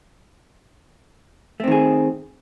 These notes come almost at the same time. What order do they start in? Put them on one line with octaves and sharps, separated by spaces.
A3 C4 D#3 G#4